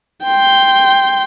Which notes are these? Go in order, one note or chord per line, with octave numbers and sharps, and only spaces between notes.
G5 C6